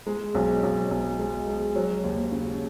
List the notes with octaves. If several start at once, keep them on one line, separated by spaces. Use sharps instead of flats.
G#3
B1
B1
B1
G#3
G#3
F#3
D#2
C#3